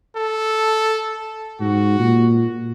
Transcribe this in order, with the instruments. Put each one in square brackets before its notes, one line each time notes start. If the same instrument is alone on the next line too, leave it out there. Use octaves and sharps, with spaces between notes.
[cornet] A4
[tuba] G#2 [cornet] F#4
[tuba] A#2